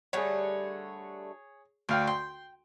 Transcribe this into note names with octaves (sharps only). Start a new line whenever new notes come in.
D3 G3 A3 G#4 C#5
D2 A3 F5 G5
G5 C6